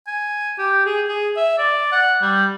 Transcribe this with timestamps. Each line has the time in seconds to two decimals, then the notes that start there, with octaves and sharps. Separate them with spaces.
0.07 G#5
0.59 G4
0.86 G#4
1.08 G#4
1.37 E5
1.58 D5
1.92 F#5
2.22 G3